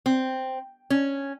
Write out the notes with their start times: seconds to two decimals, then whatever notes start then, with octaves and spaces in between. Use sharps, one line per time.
0.06 C4
0.90 C#4